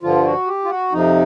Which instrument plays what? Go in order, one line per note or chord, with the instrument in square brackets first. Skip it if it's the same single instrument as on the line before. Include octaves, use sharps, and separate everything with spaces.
[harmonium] G2 D3 F3 F4
F#4
G4
F4
F#4
F2 C3 F3 D#4